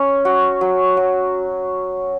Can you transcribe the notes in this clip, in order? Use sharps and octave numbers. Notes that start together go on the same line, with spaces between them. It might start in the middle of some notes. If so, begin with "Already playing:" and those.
Already playing: C#4
F#4
F#3
F#3